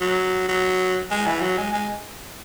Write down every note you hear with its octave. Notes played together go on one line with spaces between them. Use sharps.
F#3
F#3
G#3
E3
F#3
G#3
G#3